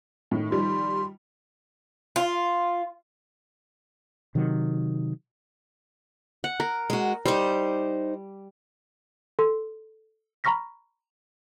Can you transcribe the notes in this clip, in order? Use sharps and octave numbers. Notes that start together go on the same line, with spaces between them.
A2 D#3
D#3 F3 G3 C6
F4
C3 D#3 F#3
F#5
A#4
G#3 F#4
G3 D#4 C5
A4 C6
A#5 B5 C#6 F6 A#6 B6